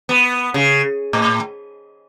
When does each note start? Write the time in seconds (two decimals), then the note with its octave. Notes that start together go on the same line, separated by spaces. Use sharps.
0.09 B3
0.54 C#3
1.13 A2